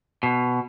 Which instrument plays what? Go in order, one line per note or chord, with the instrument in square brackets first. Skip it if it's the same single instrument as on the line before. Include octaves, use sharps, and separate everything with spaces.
[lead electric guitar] B2